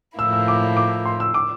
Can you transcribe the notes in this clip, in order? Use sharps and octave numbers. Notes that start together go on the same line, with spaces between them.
A2 F3 A#3 E4 E6
E6
D6
D6
C6
E6
D6